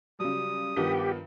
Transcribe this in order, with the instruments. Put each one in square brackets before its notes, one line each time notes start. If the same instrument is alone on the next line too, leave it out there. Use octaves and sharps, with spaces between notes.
[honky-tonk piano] C#3 F#3 [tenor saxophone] G3 [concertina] D#6
[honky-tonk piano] G2 D#3 F3 [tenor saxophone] B3 [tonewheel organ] G4